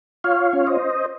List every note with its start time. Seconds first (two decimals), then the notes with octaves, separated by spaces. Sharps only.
0.24 F4 C#5 F5
0.53 C#4
0.67 C5 D#5